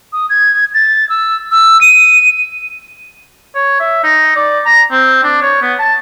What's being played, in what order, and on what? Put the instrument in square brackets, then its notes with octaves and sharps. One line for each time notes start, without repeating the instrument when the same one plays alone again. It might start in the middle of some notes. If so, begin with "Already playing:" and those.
[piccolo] D#6
G#6
A6
E6
E6
D#7
[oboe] C#5
E5
D#4
D5
A#5
C4
D4
C#5
B3
A5